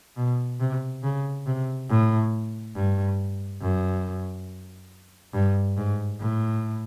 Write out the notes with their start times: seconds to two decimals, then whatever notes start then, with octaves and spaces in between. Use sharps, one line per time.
0.17 B2
0.60 C3
1.03 C#3
1.46 C3
1.90 A2
2.76 G2
3.61 F#2
5.34 G2
5.77 G#2
6.20 A2